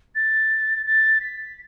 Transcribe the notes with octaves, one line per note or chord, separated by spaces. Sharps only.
A6
A6
B6